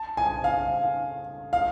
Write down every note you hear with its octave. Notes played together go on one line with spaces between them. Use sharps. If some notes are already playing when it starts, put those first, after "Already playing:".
Already playing: A5
G#5
F5
F5